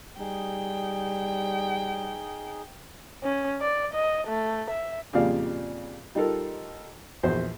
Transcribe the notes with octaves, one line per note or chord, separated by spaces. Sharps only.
G3 D#4 G#4 G5
C#4
D5
D#5
A3
E5
F2 A#2 C#3 G3 D5 F5
G3 D#4 F4 A4 A#4
A#1 E2 F#4 C5